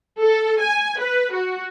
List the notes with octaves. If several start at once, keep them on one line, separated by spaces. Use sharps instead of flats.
A4
G#5
B4
F#4